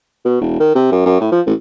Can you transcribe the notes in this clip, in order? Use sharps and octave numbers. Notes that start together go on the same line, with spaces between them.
B2
E1
D#3
C3
F#2
F#2
A2
F3
A1